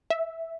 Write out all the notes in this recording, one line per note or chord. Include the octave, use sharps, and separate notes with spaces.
E5